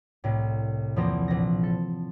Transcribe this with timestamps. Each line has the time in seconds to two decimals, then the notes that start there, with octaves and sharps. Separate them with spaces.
0.24 C2 A2
0.96 E2 F3 A#3 C4 A#6
1.28 A#1 A#6
1.63 A4